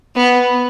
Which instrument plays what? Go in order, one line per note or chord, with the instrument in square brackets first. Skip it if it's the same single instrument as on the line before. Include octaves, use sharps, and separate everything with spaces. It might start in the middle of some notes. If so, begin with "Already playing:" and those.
[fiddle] B3